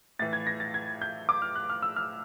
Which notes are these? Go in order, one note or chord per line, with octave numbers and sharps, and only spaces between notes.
A2 E3 A6
G#6
A#6
A6
G#6
G6
D6
F6
F#6
F6
E6
F6